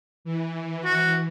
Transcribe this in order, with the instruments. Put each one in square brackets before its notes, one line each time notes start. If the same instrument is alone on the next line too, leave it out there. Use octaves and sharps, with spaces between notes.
[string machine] E3
[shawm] F#4